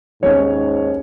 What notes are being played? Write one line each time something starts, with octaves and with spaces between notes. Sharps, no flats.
D#2 G#2 C#4 C#5 G#5